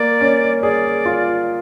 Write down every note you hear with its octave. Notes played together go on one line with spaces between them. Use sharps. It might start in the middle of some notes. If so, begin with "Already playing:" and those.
Already playing: A#3 D5
C#4
G#4 D5
F4